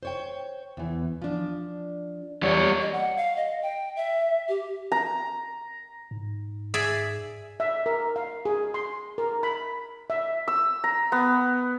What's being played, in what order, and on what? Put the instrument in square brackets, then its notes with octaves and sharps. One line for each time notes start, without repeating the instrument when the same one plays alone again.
[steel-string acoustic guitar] C5 C#5 G5
E2 E3
F3 D4
[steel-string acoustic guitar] E2 G#5 [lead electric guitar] G3 C#5
[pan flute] D#5
F#5
F5
D#5
G5
E5
G4
[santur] A#5
[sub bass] G#2
[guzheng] G#4 D5 E5
[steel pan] E5
A#4
F5
G#4
C6
A#4
B5
E5
[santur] E6
A#5
B3